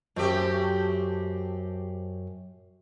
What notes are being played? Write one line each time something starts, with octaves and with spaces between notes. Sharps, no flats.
F#2 A3 C4 G4